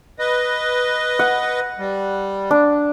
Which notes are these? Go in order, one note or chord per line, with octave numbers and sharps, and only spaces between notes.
B4 D#5
F#5
G3
D4